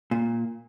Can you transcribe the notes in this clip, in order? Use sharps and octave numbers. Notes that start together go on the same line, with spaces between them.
A#2